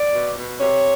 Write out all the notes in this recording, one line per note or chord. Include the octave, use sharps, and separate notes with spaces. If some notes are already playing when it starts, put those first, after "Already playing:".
Already playing: D5
B2
B2
C3 C#5